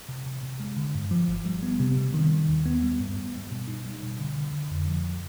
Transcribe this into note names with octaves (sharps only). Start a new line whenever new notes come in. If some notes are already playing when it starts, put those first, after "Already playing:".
C3
C3
C3
G#3
D3
G2
F3
G1
G3
B3
C3
G3
D#3
D#3
D#2
B3
G3
G2
B3
G3
B2
D#4
G3
B2
D3
D3
D3
F2
F3